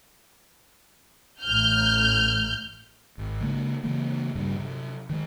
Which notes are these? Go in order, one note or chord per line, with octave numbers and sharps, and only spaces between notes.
A1 F6 G6
G#1
C#3 G#3 A#3
C#3 E3 G#3 A#3
G2 A#2 C#3 G3
C3 F#3
D#3 G#3